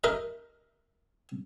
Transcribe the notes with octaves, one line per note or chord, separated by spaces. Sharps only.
D#4 A#4 D#5 E5